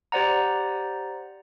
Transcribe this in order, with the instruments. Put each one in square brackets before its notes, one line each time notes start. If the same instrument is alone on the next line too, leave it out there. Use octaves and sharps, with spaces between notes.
[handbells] G4 C5 D5 F#5 A#5